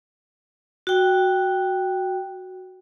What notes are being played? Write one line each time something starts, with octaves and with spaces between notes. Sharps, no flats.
F#4 G5